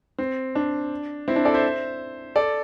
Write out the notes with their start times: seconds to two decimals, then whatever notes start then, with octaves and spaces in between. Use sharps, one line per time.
0.18 C4
0.55 D4
1.28 C4 E4
1.36 D4
1.45 A4 D5
1.54 C5 E5
2.36 A4 D5